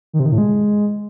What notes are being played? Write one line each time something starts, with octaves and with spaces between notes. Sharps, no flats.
D#3
C3
D#3
A2
G#3